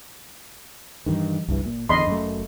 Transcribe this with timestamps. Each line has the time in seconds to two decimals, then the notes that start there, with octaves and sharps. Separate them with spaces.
1.06 G2 D#3 E3
1.48 G1 C2 G2 E3
1.65 A#2
1.89 E2 D3 D#5 B5 C6
2.07 F#2 A3